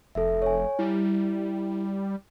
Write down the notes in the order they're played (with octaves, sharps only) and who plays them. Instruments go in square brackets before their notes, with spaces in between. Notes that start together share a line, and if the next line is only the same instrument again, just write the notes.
[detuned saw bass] F1 [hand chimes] A4 E5
[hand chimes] C#5 G#5
[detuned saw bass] G3 [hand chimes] E4